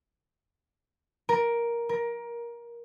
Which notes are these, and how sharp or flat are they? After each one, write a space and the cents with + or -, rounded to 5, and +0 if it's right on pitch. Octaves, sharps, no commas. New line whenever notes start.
A#4 +10
A#4 +20